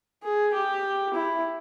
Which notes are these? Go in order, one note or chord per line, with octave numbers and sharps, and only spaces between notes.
G#4
G4
E4